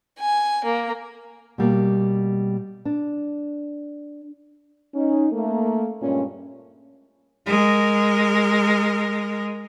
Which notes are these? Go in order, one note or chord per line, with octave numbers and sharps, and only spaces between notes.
G#5
A#3
B2 G3 A#3
D4
C#4 D#4
A3 A#3
G2 A#2 G#3 C#4
G#3 A#4